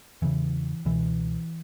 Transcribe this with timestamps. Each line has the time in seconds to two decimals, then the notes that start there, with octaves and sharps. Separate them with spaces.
0.22 E2 C#3 E3
0.85 C#2 B2 E3